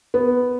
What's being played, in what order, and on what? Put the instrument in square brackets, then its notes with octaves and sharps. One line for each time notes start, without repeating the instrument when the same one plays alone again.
[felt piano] B3